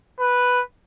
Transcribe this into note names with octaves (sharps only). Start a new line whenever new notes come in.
B4